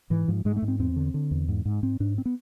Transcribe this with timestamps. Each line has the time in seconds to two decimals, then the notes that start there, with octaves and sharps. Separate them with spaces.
0.10 G#2 E3
0.28 G#2 F3
0.45 G#2 G#3
0.56 A3
0.62 G#2
0.68 C4
0.79 E2 C4
0.96 D3
1.14 D3
1.31 E2
1.48 G#2
1.65 G#2
1.83 G#2 C4
2.00 G#2 D4
2.18 C4
2.26 B3